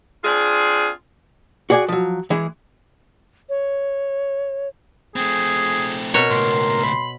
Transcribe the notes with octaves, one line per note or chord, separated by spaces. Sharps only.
C4 D4 F4 G#4
F#4 G#4 D5 F#5 G#5
F3 F#3
E3 G#3 G#4
C#5
A3 C4 G#4
B2 A#4 C#5
C#2 A2 C6
B5